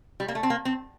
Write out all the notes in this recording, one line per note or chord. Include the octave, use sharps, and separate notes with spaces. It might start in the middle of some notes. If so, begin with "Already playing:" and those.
G3
A#3
A3
C4
A#3
C4